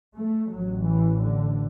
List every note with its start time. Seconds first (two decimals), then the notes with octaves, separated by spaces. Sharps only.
0.15 A3
0.50 A1 A2 F#3
0.84 E3
1.20 D3